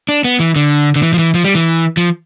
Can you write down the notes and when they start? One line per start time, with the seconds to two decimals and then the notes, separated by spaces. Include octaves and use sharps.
0.09 D4
0.24 B3
0.40 E3
0.56 D3
0.96 D3
1.03 E3
1.13 F3
1.19 E3
1.34 F3
1.44 G3
1.55 E3
1.97 F3